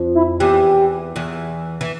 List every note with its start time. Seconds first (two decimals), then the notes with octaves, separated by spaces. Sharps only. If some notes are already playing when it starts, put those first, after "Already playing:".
Already playing: F2 F3
0.15 E4
0.40 E2 E3 G4
1.16 E2 E3
1.81 E3